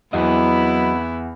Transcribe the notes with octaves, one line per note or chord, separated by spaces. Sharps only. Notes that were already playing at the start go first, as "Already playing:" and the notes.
E2 F#3 B3 C4 E4 D#5